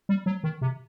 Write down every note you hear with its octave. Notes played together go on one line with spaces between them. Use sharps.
G3
F#3
D#3
C3